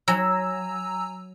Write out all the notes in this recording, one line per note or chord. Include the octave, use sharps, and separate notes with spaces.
F#3 G#5 A#5 E6